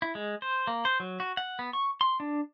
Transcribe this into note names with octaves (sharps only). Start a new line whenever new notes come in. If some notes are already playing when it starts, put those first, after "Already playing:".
E4
G#3
C5
A#3
C5
F#3
F#4
F#5
B3
C#6
C6
D4